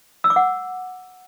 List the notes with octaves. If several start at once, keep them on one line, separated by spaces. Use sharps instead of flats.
E6
D6
F#5